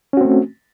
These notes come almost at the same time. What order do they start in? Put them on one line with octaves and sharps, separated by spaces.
C#4 F#4 C4 A3